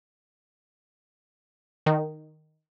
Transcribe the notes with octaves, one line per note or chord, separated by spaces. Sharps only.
D#3